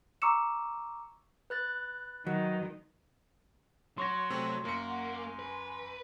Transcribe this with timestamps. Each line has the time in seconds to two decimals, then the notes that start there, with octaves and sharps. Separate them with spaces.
0.22 A#5 C#6 D6 E6 C#7 E7
1.50 B4 F#6 A6
2.27 D#3 F#3
3.98 F#3 C#5 C6 C#6 A#6
4.30 C3 A3 C4
4.65 F#2 A#3 C#7
4.88 F#5
5.17 G#5
5.39 B4